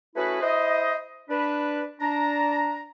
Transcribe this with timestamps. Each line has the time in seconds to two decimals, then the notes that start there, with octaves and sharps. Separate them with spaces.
0.16 A3 C#4 E4 F#4 G#4 B4
0.42 E4 C5 D#5
1.30 D4 B4
2.01 D4 A#5